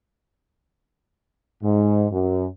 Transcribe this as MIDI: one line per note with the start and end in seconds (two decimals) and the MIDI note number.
1.63 2.05 44
2.11 2.46 42